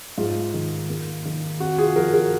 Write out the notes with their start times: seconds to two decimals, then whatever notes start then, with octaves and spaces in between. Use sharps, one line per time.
0.18 G#2 F4
0.54 D#3
0.90 A#3
1.25 D#3
1.60 C4 F#4
1.78 F4 G#4
1.96 F3 F#4 A#4
2.13 F#4 A#4